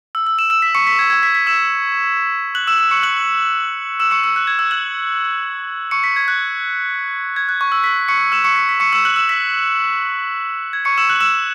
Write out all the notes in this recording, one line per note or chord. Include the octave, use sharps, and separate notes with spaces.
E6
E6
E6 E7
E6 E7
B6
C#6 C#7
B6
G#6
G#6
B6
B6
E6 E7
F#6 F#7
E6 E7
E6 E7
C#6 C#7
F#6 F#7
E6 E7
C#6 C#7
E6
F#6
G#6
E6
F#6 F#7
C#6 C#7
B6
G#6
F#6
G#6
F#6
C#6
E6
B6
C#6 C#7
E6 E7
C#6 C#7
B6
B6
C#6 C#7
E6 E7
F#6 F#7
E6 E7
B6
G#6
C#6 C#7
E6 E7
F#6 F#7
E6 E7